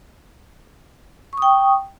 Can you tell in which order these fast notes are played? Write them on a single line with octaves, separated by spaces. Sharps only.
C#6 D#6 G5